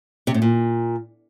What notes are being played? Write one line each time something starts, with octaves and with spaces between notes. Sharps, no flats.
C3
A2
A#2